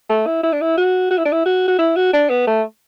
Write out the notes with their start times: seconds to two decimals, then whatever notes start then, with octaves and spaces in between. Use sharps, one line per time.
0.09 A3
0.26 E4
0.43 E4
0.53 D4
0.61 E4
0.77 F#4
1.10 F#4
1.18 E4
1.25 D4
1.32 E4
1.46 F#4
1.68 F#4
1.78 E4
1.96 F#4
2.13 D4
2.30 B3
2.47 A3